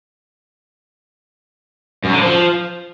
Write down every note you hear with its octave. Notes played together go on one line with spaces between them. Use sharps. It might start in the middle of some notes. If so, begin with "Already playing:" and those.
F#2
D3
F3